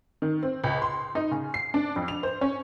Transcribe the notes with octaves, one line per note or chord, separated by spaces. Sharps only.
D#3
C4
C#2
C6
D#4
C#3
C7
D4
F2
F7
C5
C#4